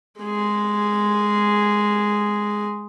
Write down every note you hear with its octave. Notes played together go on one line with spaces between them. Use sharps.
G#3 G#4